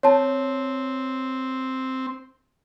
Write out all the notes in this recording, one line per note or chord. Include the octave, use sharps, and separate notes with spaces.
C4 C#5 A5